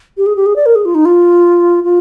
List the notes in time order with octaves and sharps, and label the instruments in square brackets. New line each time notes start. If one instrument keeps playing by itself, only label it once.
[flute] G4
G#4
G4
G#4
D5
A#4
G#4
F4
D#4
F4
F4